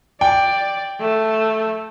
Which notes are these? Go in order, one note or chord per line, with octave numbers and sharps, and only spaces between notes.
D5 G5
A3